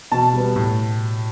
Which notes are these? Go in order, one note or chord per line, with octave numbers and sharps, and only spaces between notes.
B2 A5
G3 B3
A2